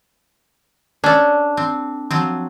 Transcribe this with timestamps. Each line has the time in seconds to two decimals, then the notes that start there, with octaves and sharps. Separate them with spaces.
1.04 C#4 D4 A4
1.57 C4
2.11 F3 F#3 C4